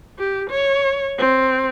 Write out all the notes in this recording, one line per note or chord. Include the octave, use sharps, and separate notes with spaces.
G4
C#5
C4